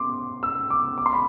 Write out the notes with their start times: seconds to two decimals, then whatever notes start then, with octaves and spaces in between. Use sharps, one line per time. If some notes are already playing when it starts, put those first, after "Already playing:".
Already playing: C6 D6
0.43 E6
0.70 D6
0.98 D6
1.06 C6
1.13 B5